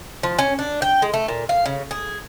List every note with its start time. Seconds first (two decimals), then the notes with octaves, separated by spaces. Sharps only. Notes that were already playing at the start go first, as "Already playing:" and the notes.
0.23 F3
0.39 C#4
0.59 D4
0.82 G5
1.02 G#3
1.14 A3
1.28 A#2
1.49 F5
1.66 C#3
1.91 G#4